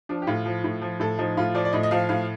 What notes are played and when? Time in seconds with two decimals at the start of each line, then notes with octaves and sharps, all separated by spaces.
0.09 F3 D4
0.22 G4
0.27 A2 F4
0.46 F3
0.64 A2
0.82 F3
1.00 A2 A4
1.18 F3 D#4
1.37 A2 F4
1.55 F3 D5
1.65 D5
1.72 A2 D#5
1.83 D#5
1.91 F3 F5
2.09 A2 F5